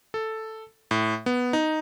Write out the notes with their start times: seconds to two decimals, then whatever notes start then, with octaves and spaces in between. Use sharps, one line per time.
0.14 A4
0.91 A2
1.26 B3
1.53 D#4